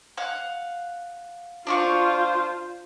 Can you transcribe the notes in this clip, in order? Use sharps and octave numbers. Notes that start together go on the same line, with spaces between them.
F5 F#5
D4 F4 C5 F5 C#6